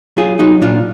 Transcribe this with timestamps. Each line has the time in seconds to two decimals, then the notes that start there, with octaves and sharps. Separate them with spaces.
0.17 F#3 F4 G#4
0.39 F#3 D#4 F#4
0.62 A#2 D4 F4